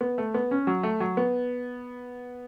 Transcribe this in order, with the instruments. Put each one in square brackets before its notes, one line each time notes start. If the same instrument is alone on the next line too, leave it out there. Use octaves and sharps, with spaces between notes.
[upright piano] B3
A3
B3
C#4
F#3
A3
F#3
B3